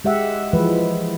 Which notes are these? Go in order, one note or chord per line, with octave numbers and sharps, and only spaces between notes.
G#3 G4 E5 F#5
E3 F3 G#3 B4